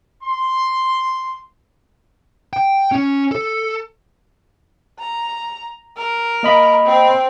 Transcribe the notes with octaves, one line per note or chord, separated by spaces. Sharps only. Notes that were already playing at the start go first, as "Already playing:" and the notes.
C6
G5
C#4
A4
A#5
A#4
A#3 D#5 B5
C4